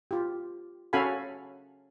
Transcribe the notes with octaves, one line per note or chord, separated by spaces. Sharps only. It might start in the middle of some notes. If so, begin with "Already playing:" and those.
F4 G4
C#4 F#4 A4 F5 G#5 B5